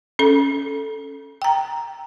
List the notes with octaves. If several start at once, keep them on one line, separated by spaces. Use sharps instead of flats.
C#4 A4
G5 A#5